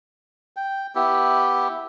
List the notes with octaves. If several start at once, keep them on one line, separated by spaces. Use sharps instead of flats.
G5
B3 E4 G4